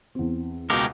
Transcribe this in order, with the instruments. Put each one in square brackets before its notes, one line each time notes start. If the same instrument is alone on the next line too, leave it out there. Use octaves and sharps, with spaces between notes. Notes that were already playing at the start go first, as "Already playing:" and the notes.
[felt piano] E2 C4
[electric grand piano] C#2 B2 [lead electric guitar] G#3 G4 [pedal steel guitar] A#4